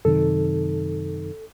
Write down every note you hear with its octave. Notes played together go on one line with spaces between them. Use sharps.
F#2 C3 D#3 A4